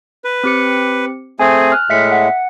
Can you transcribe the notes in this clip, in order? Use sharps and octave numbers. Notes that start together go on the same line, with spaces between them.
B4
C4 G4 C#7
A3 C4 G#4 G#5
F6 F#6
A2 G#3 E5 B6 C#7
F#5